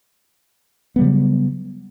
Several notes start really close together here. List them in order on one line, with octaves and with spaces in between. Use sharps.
B3 G3 C#3 F#3